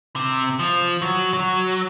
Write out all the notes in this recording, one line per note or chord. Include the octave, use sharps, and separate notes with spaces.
C3
F3
F#3
F#3